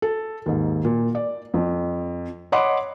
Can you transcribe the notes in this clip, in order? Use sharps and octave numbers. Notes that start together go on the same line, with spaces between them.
A4
D#2 G#2
A#2
D5
F2
C#5 D#5 F#5 B5 C6 D6